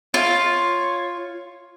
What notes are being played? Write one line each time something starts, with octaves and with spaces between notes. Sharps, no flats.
F4 C#5